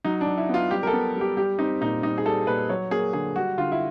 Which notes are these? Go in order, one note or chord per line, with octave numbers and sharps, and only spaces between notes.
F#3 D#4
D4
F#3
E4
B3 F4
G3 G4
A#4
A4
B3
G3
G4
G3 G4
C4 D#4
A#2 D#4
G3 D#4
G#4
G3 A4
A#2 B4
F#3 C#5
A#3 G#4
D3 G#4
G3 F#4
D3 F4
E4